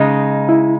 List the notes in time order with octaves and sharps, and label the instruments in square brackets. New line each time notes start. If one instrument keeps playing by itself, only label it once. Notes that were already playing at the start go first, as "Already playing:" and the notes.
Already playing: [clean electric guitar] C#3 G#3 D#4 [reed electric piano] D#5
[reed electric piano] E4